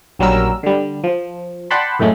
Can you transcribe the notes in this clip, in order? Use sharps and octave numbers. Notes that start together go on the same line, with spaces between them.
A#1 F#3 G3 C#4 A#4 E6
D3 G3
F3
D5 F#5 G5 A5 B5 C6
F#2 A2 C#3 G#3 A3